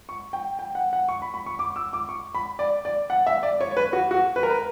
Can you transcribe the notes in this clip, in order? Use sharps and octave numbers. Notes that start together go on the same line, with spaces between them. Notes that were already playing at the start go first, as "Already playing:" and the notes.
C#6
G5
G5
F#5
F#5
C#6
B5
B5
C#6
D6
E6
D6
C#6
B5
D5
D5
F#5
E5
D5
C#5
C#5
B4
F#4
F#4
B4
A#4
B4